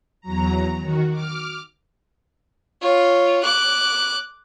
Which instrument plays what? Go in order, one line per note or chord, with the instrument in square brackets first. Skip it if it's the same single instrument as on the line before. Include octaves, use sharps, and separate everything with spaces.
[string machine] E2 F#3 A#5
D#3 F#4
D6 F6
[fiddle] F4 C#5
D6 F#6